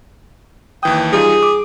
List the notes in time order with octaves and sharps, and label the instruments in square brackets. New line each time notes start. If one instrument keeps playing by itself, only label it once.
[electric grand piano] D#2 E3 D#6 [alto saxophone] G5
[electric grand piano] G3 D#4 F4 [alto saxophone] G#4
[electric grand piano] D6